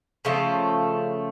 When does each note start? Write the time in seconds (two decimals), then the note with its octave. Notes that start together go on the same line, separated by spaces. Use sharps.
0.25 C#3 F3 A3